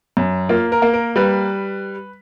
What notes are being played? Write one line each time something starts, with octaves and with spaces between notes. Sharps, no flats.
F#2
A#3 F4
A#4
A#3
A#4
G3 B4